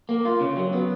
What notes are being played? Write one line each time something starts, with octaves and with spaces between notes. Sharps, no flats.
A#3
F4
C#3
F#3
B3